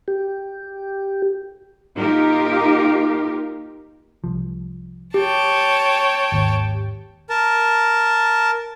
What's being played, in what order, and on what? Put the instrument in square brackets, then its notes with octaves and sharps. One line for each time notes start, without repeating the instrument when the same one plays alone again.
[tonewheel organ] G4
[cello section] A#3 D#4 F4 G4 A#4
[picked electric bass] C2 F3
[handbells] G4 [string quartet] C#5 G5 A5
[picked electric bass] G#1 D#2
[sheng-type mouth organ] A#4 A5